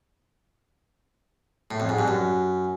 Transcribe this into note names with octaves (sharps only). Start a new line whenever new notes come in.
A2
F2
G#2
G2
F#2